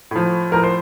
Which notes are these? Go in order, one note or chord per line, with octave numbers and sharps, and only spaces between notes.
A2 F3
A2 F3 A#4
C5